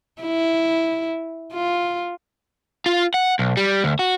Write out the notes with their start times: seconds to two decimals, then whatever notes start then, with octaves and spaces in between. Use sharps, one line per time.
0.22 E4
1.53 F4
2.86 F4
3.14 F#5
3.39 B1
3.57 G3
3.84 D2
3.99 F#4